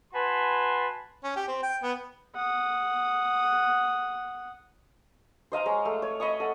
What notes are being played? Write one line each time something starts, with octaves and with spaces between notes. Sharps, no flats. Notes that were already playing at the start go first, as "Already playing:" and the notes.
F#4 B4 G#5 A5 C6
C#4
G4
C4
G5
B3
F#5 D#6
C5 D#5 F5 A#5
G#3 C#5 A#5
A3
C#5
D#5 B5 C#6 D#6
A4 F#5